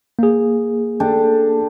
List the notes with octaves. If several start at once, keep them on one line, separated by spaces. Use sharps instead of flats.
A#3 G#4
D4 G4 A4